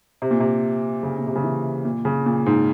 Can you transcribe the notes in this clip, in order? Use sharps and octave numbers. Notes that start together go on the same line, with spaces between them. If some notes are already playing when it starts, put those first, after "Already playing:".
C3
A#2
C3
C#3
A#2
C3
C#3
E3
A#2
C#3
A#2
G#2